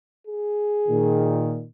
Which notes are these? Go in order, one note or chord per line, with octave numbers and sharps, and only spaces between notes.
G#4
A#2 D#3